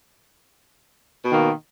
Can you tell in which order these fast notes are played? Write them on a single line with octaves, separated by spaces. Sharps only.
B2 D#3 A#3